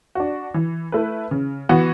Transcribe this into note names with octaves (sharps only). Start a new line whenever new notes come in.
D4 F#4
E3
A3 E4 B4
C#3
E3 B3 F#4